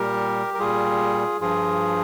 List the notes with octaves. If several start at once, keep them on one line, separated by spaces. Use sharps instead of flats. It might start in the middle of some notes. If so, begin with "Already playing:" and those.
Already playing: A#2 G3 G4 A#4
A#4
A#2 G3 F4 G#4
G2 F3 F4 G#4